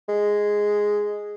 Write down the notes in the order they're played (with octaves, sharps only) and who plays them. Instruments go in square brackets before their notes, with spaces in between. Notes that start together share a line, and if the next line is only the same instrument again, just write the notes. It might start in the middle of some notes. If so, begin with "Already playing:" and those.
[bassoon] G#3